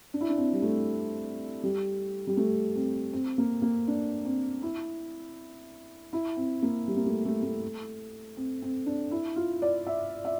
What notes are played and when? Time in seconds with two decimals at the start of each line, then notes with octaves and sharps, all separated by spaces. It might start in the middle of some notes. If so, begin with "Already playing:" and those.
0.14 D4
0.21 E4
0.29 D4
0.37 C4
0.53 G3
0.62 A3
1.63 G3
2.27 G3
2.37 A3
2.75 C4
3.13 C4
3.38 A#3
3.62 A#3
3.88 D4
4.25 C4
4.62 E4
6.13 E4
6.37 C4
6.63 A#3
6.88 G3
6.97 A#3
7.06 A3
7.25 A3
7.43 A3
8.37 C4
8.62 C4
8.86 D4
9.11 E4
9.36 F4
9.62 D5
9.86 E5
10.25 E5